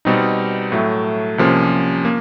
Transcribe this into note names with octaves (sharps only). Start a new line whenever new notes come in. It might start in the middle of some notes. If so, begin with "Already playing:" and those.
B2 G3 C4 D#4
A2 F#3 A3
C2 C3 F3 A#3 C#4
A#3